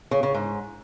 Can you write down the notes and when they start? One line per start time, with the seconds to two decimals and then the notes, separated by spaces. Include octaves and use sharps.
0.11 C#3
0.23 C#3
0.34 G#2